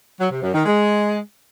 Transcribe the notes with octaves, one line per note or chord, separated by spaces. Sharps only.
F#3
C3
F#2
D#3
G#3